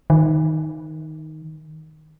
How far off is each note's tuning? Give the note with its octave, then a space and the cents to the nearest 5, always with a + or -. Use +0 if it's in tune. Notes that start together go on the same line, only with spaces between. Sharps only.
D#3 +5